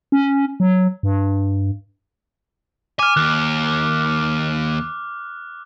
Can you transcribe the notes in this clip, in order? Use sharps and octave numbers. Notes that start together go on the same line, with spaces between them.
C#4
F#3
G2
G#5 D6 F6
D#2 F#6